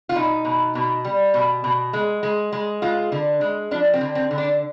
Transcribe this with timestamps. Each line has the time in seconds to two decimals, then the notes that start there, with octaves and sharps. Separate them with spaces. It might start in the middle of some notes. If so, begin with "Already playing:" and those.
0.09 F4
0.16 B2 D#4
0.45 B2
0.75 B2
1.05 G3
1.34 B2
1.64 B2
1.93 G#3
2.23 G#3
2.53 G#3
2.82 G#3 F4
3.12 D3
3.41 G#3
3.71 F3 D4
3.94 C4
4.01 D3
4.15 C4
4.31 D3
4.38 D4